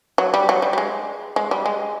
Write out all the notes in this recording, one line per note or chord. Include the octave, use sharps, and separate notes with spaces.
F#3
G3
F#3
G3
G3
G#3
G#3
G3
G#3